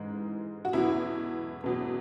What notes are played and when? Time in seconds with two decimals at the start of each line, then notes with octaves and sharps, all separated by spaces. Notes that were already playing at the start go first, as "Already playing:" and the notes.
Already playing: G#2 E3 G#3
0.65 F#4
0.73 E2 B2 F#3 E4
1.64 E2 B2 F#3